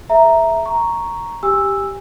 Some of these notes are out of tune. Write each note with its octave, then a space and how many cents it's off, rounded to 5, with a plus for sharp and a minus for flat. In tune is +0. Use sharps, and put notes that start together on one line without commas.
G#4 +35 E5 +0 A#5 +0
A#5 +0 C#6 +0
G4 +0 G#5 -25 E6 +0